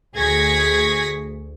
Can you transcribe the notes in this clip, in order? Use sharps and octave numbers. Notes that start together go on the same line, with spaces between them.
D2 G#4 C#6 G#6 A#6 B6